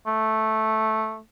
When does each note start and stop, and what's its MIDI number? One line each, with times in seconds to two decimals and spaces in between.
0.07 1.19 57